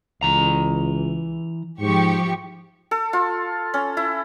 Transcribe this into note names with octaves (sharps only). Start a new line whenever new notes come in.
C#2 E3 A#5
G#2 F3 G4 C#6
A4
F4
C#4
E4